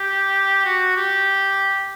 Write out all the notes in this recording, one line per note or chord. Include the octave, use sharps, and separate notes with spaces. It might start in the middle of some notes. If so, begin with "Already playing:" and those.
Already playing: G4
F#4
G4